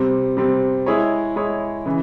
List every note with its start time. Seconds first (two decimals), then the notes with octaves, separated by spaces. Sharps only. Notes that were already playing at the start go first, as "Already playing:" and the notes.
Already playing: C3 G3 C4
0.37 C3 G3 C4
0.86 G#3 E4 G#4 C#5
1.36 G#3 E4 G#4 C#5
1.86 C#3 E3